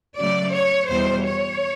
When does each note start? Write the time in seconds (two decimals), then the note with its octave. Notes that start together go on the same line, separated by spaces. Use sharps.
0.18 C#3 F#3 A3 D5
0.54 C#5
0.89 E2 B2 G3 C5
1.25 C#5